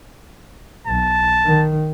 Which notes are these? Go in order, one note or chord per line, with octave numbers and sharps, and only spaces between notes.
B1 A5
D#3